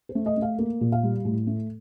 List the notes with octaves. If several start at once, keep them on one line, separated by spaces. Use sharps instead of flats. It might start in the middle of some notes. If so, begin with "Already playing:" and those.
C5
A3
D#5
A3
F5
A#3
A#2
F5
G3
A2
A3